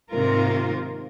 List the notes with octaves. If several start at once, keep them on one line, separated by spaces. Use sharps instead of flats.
G#2 C3 D#3 A#3 F4 A#4